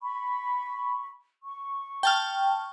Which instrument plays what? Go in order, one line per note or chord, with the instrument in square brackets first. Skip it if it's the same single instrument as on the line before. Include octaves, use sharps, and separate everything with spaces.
[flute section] B5 C#6
C#6
[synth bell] G5 A5 F6